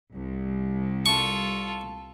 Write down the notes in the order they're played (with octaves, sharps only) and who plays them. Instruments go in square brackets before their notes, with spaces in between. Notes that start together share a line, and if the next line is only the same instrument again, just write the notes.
[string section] C2
[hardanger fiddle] F4 A4 [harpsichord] C#6